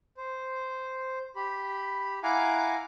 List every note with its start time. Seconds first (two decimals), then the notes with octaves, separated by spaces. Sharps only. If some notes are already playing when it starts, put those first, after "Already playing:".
0.17 C5
1.36 G4 B5
2.23 E4 F5 F#5 G#5 A#5 D6